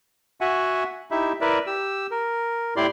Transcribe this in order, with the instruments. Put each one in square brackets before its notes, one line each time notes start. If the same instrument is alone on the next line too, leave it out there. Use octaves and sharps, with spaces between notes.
[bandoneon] F#4 E5 F#5 G#5
D#4 E4 G4 E5
E4 A#4 B4 D5 E5
G4 E6
A#4
A2 E4 G4 D5 C6